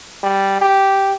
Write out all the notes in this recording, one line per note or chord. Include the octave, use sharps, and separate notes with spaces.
G3
G4